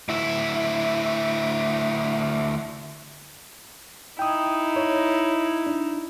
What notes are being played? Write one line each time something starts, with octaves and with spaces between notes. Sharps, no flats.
D2 E4
D#4 E4 G5 D#6
C#5
D4